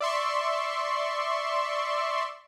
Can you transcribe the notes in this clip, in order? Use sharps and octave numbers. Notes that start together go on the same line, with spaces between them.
D5 E5 C6 C#6